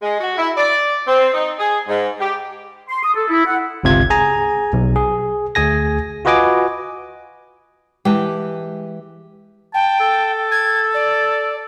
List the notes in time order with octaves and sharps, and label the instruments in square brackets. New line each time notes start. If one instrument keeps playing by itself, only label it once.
[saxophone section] G#3
F#4
E4
D5
C4
D#4
G#4
G#2
G4
[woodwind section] C6
D#6
A4
E4
F#5
[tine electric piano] G1 C#2 C3 F4 G#6
G#4 G#5 A#5
B1
G#4
D2 G#4 G#5 A#6
F4 F#4 B4 D#5 G#5 D6
[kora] E3 G4 [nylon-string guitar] G#3 A5
[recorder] G5 [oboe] A5
[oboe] A4
[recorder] G#6
D5